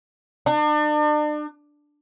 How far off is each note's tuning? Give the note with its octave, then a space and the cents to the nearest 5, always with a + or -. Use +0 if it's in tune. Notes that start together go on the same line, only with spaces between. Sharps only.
D4 +40